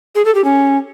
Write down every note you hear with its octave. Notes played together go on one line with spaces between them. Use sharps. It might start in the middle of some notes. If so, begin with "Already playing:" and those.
G#4
A4
G4
C#4